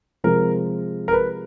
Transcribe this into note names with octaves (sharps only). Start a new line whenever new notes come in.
C3 F3 G#3 A#4
A#4
B4